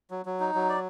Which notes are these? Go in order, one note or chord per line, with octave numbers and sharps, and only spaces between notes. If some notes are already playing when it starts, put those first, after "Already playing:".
F#3
F#3
D#4
F#3
D5